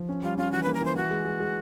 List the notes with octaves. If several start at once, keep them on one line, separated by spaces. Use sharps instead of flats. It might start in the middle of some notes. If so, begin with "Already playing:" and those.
Already playing: F3
C#4
G3 F4
C#4 F4
E3 F#4
A#3 B4
A#4
E3 C5
E3 F#4
G#3
G#3
G#3